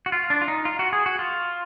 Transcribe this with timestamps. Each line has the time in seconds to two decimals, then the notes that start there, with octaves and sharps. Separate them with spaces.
0.06 F#4
0.12 F4
0.30 D4
0.41 F4
0.48 D#4
0.65 F4
0.79 F#4
0.93 G#4
1.06 F#4
1.19 F4